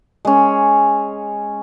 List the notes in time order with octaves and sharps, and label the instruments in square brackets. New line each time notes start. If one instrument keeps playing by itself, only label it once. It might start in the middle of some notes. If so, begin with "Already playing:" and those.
[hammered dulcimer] G#3 C#4